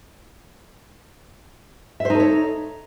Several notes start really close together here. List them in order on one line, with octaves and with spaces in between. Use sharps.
E5 C5 D#4 A4 C#5